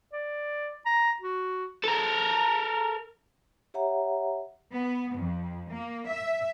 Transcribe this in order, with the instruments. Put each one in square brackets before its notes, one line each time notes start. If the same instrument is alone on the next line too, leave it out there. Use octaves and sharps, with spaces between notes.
[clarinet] D5
A#5
F#4
[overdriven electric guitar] A4 A#4
[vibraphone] G4 C#5 E5 F#5 A#5
[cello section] B3
F2
A#3
E5